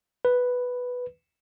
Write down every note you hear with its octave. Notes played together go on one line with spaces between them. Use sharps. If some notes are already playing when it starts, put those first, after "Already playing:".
B4